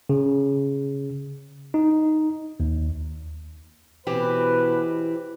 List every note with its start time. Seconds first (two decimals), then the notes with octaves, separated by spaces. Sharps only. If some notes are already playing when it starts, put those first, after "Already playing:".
0.09 C#3
1.74 D#4
2.60 D#2
4.07 B2 E3 C4 G4 B4